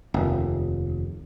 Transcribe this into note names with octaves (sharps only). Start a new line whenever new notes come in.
F1 D#2